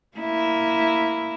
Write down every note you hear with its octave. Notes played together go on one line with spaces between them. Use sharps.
A#3 E4